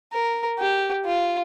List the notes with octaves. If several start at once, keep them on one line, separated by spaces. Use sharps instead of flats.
A#4
G4
F4